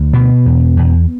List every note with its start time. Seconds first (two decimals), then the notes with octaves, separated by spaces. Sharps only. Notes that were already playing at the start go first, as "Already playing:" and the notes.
Already playing: D2
0.13 B2 B3
0.45 E2
0.77 E2